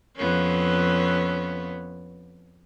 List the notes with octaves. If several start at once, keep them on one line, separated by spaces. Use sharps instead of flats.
F2 B3 C#4